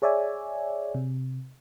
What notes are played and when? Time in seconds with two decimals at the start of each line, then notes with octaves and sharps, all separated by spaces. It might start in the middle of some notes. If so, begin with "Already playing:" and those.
0.02 G#4 C#5 D5 E5 G#5
0.95 C3